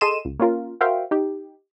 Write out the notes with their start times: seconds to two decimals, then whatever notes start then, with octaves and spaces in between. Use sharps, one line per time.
0.01 G#4 A4 D#5 C6 D#7 E7
0.25 C#2
0.40 A#3 C#4 F4 A#4
0.81 F#4 A#4 C5 E5 F5 G5
1.11 D#4 G4